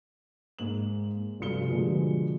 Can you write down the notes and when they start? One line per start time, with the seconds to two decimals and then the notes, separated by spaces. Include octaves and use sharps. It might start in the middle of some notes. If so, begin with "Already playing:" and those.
0.59 G#2 A#3 F#7
1.39 F1 G2 B2 F4 C#7 G7
1.70 B2 D3 F3 G3 G#3 A#3